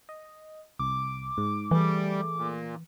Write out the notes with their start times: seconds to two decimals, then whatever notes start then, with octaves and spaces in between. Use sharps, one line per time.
0.09 D#5
0.79 C2 D6
1.38 G#2
1.71 E3 G3 A3 G#4
2.36 A#2